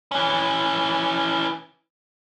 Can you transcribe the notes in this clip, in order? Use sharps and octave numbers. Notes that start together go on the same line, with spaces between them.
E3 C#4